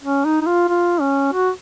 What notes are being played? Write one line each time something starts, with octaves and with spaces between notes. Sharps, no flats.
C#4
D#4
D#4
F4
F4
C#4
F#4